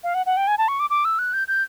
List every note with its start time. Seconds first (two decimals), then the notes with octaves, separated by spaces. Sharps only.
0.04 F5
0.14 F#5
0.26 F#5
0.37 G5
0.48 G#5
0.58 A5
0.68 C#6
0.80 D6
0.90 D6
1.05 E6
1.19 F#6
1.33 G6
1.48 G6